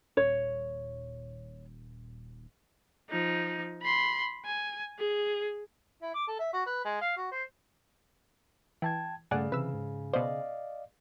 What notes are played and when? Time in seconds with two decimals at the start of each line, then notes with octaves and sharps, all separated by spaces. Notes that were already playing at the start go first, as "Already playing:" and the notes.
0.17 D#1 C#5
3.10 F3 D#4
3.82 B5 C6
4.45 G#5
4.99 G#4
6.02 E4
6.15 D6
6.28 A4
6.39 E5
6.53 F#4
6.66 B4
6.85 G#3
7.01 F5
7.17 F#4
7.31 C5
8.82 E3 G5 A5 G#6
9.31 G2 C#3 A3 D5 F#5 G#5
9.52 C3 E3 B4 E6
9.73 G#2
10.14 B2 C5 D5 D#5 F5